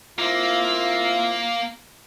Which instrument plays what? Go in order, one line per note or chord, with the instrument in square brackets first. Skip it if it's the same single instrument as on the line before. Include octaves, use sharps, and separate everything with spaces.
[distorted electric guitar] A#3 [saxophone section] C4 E4 F4